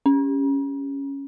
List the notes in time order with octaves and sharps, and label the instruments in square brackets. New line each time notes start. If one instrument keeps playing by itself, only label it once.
[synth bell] C#4